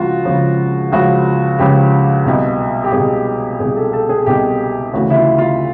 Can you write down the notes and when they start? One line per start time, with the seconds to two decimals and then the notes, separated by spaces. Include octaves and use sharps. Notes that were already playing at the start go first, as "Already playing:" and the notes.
Already playing: C#2 C#3 F3 F4 F#4
0.25 C#2 C#3 F3
0.92 C#2 C#3 F3 F#4
1.59 C#2 C#3 F3 G4
2.25 C2 B2
2.84 G4
2.92 C2 G#4
2.97 B2
3.60 B2 G#4
3.63 C2
3.76 A4
3.93 A4
4.09 G#4
4.26 C2 B2 G4
4.94 D2 C#3 E3 F#4
5.10 E4
5.16 F4
5.38 F4